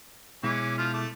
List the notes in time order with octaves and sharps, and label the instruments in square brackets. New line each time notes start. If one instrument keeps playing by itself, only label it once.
[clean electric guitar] B2 G#3 E4 [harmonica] E3 C#4 D6
[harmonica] F3 F4 F6
A3 D6